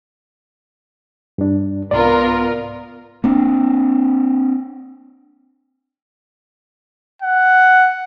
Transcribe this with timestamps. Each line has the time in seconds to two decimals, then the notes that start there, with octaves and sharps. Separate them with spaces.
1.38 G2 D4
1.91 C2 G#2 B3 F4 A#4 D5
3.24 A#3 C4 D4
7.22 F#5